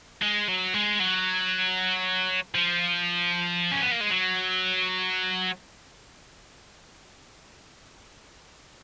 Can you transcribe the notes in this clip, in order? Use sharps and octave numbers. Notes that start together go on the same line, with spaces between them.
G#3
F#3
G#3
F#3
F3
C#4
B3
A#3
G#3
F#3